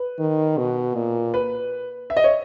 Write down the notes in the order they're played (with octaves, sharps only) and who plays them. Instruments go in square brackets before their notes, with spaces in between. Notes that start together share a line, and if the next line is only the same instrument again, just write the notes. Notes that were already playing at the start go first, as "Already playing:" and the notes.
Already playing: [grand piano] B4
[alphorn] D#3
B2
A#2
[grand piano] B4
E5
D#5
C#5